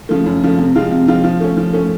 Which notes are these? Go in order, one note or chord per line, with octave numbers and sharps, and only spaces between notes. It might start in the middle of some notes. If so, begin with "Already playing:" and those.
C#3 F3 A3
F#2
C#3 F3 A3
C3
F3 G#3 C4 F4
C3
F3 G#3 C4 F4
F3
A3 C#4
F3
A3 C#4